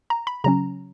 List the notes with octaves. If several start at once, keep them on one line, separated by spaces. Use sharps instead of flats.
A#5
B5
C#3 F#3 C#4 A#5